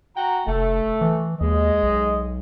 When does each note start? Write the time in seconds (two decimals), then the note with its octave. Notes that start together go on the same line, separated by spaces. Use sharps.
0.17 F#4 G5 A#5
0.47 F1 A3
1.01 E3
1.41 D#2 G#3 D#5
1.83 B1